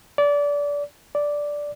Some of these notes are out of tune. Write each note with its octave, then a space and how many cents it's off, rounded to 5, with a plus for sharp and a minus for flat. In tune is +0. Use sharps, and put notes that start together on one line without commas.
D5 -25
D5 -5